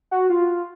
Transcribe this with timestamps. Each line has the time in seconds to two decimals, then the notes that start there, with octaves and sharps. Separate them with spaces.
0.11 F#4
0.30 F4